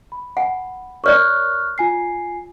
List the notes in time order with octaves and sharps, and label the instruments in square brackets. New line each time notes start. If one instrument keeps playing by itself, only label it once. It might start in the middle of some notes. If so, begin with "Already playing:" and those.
[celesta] B5
[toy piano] F#5 G#5
[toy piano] A#4 C#5 D5 [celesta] C#6 F6 F#6
[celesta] F4 G#5 C7